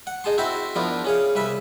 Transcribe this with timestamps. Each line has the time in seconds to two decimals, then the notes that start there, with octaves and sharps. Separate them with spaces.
0.07 F#5
0.24 D#4 G#4 A5 C6
0.38 C4 E4 F#4 C5 E5 C6
0.76 F3 B3 D4 E4 A#4
1.04 C#4 G#4 F5
1.35 C2 B4 E5 B5